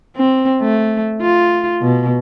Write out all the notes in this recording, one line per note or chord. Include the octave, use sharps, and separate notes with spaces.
C4
A3
F4
B2